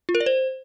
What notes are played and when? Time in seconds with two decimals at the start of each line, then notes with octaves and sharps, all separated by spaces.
0.09 F4
0.15 A#4
0.20 D5
0.26 C5